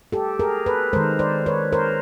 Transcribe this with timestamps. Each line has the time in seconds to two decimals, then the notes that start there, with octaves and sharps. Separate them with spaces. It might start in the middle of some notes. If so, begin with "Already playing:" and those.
0.12 G4 A4
0.39 G#4 A#4
0.66 A4 B4
0.93 D#3 G#3 A#4 C5
1.19 C5 D5
1.46 B4 C#5
1.72 A#4 C5